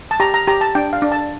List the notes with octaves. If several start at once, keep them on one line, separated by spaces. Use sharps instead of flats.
A5
G4 A#5
A#5
G4 A#5
A5
D4 G5
F5
D4
A5